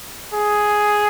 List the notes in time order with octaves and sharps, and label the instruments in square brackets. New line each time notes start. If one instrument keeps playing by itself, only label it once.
[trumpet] G#4